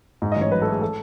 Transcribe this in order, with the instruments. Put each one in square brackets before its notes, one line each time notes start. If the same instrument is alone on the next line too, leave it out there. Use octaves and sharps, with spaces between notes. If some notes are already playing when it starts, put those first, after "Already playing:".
[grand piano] G#2
D#5
A1
C#5
F#3 B4
A4
A3
G#4
A4